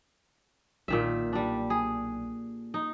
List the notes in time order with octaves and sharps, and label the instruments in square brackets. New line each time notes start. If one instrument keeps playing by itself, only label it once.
[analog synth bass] B1 [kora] A#2 D#3 E5
[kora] G3 D4
G#4
D#4